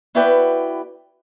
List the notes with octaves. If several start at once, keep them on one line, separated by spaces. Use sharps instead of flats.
B3 E4 F#4 B4 D5 G5